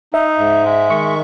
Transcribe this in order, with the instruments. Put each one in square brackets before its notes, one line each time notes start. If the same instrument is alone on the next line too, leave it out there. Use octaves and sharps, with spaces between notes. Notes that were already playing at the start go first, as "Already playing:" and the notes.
[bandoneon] D#4 [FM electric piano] E5
[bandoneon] G#2
G#3
[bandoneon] D#3 [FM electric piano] C#6